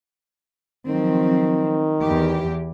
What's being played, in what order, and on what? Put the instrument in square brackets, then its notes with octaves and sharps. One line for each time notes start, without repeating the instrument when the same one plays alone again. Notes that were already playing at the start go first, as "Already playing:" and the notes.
[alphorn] D#3 [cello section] F3 F#3 C4
[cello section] E2 E3 G4